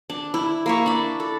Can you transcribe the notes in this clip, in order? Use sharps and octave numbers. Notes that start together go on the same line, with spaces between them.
D4
E4
A#3 E5 C#6
D4 B5
A4